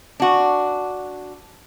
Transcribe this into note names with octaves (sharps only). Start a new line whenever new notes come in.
D4 F#4